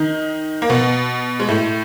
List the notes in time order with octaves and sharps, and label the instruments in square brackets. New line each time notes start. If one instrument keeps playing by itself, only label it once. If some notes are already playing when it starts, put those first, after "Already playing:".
Already playing: [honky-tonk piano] D#3 D#4
A#3
B2 B3
G#3
A2 A3